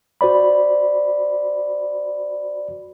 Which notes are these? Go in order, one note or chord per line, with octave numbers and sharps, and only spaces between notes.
F#4 C5 D5 B5